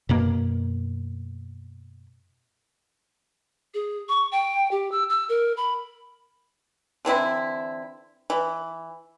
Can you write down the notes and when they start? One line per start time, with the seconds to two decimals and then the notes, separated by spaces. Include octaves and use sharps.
0.09 F#2 B2 A#3
3.74 G#4
4.09 C#6
4.32 G5
4.71 G4
4.92 E6
5.10 E6
5.29 A#4
5.57 B5
7.05 D3 E3 C4 E4
8.30 E3